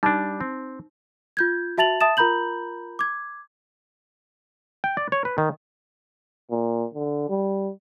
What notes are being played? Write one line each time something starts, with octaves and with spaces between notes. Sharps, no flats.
G3 D4 D#4
C4
F4 G6 G#6
F#4 E5 A5 A6 F7 F#7
E5 A5 D#6 A6 E7
F4 A#4 A#5 B5 G6 F#7
D6 G#6
G5
D5
C#5
B4
D#3
A#2
D3
G3